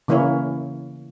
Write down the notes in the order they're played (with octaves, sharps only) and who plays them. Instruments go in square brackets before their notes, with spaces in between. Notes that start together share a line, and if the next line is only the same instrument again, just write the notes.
[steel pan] C#3 E3 A#3 C#4 E4 C#5